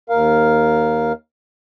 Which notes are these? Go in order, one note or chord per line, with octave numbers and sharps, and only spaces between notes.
D#2 A#4 F5